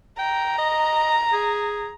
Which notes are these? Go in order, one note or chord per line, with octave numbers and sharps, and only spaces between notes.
G5 A#5
D#5
G#4